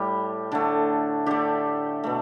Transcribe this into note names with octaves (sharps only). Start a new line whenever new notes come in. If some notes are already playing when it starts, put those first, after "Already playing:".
Already playing: A2 G3 G4
D3 A3
D3 A3 G4
B2 A3